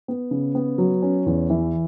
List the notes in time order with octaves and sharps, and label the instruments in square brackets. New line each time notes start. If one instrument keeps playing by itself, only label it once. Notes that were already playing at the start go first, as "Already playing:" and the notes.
[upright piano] B3
C#3
B3
F#3
C#4
E2
E3